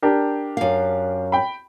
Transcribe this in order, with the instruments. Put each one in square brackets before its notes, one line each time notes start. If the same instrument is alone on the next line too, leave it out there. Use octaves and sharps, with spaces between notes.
[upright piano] D4 G4 A#4
[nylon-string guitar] F#2 F5
[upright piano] G5 B5